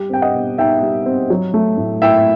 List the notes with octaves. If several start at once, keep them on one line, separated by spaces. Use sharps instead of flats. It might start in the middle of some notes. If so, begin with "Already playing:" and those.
Already playing: G3 G4
C4 G5
D#5 F#5
B2
D#4 E5 G5
G3
C4
F#3
A3
A2
E4 E5 G5